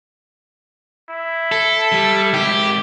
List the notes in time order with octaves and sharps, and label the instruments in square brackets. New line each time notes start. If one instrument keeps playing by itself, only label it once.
[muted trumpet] E4
[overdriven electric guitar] A4
[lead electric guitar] G3
[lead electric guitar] D#3 G#3 [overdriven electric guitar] G4